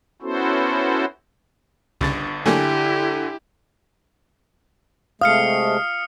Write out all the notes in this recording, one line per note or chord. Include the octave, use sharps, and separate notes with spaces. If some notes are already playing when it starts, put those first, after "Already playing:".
B3 C#4 E4 F#4 A4 C5
G1 C2 G2 C#3 A6
D3 F#3 A3 A#3 E4 G4 G#5
C3 G#3 A3 F5 D#6 F6 C#7